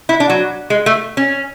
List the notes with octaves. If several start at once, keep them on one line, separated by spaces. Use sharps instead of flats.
E4
D4
F#3
G#3
A3
C#4